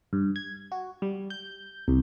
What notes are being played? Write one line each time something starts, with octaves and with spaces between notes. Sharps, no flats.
G2
G#6
F#4
G3
G6
C2